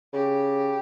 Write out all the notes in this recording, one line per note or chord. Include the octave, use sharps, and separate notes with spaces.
C#3 G4